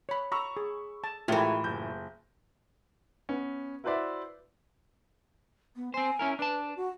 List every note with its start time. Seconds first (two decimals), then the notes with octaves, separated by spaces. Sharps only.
0.09 C#5 B5
0.32 A#5 B5 C#6 E6
0.57 G#4
1.04 A5
1.28 A2 E3 G#3 A3 F4 G4 A#4
1.64 F#1 G6
3.29 B3 C#4
3.84 E4 F#4 B4 C5 D5 E5
5.76 B3
5.94 C4 C5 G#5
6.19 C#4 E4 A#4
6.39 D4 B4 A5
6.76 F#4